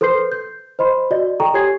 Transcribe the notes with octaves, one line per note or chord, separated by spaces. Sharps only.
A4 B4 C5 C6 G6 C7
G6
C5 D#5 B5 C6
F#4 D5 D#5
A4 G5 A#5 C#6
G4 C#5 G#5 D#6 G#6 C7